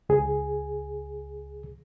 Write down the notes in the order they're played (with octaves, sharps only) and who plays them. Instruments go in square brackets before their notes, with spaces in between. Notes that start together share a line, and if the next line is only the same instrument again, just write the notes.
[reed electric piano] C#2 G#4